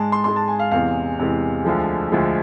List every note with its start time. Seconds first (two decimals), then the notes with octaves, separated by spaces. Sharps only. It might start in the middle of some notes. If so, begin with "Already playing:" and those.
Already playing: G#2 G#3 A5
0.12 C6
0.24 G#2 G#3 C6
0.36 A5
0.48 G#5
0.59 F5
0.71 E2 C3 E3 G#3 F5
1.19 E2 C3 E3 G#3
1.65 D2 D3 F3 G#3
2.12 D2 D3 F3 G#3